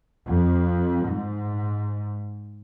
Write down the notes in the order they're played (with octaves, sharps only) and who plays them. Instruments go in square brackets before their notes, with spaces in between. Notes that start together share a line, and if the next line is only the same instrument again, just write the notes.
[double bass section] F2
G#2